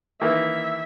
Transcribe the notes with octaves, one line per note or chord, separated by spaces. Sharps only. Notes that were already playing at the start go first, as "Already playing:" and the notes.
D#3 E3 A#3 E5